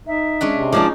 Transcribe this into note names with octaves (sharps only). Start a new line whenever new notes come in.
D#4 E5
G#3 C#4 D4
C3
F3 G#3 D4 D#4 D6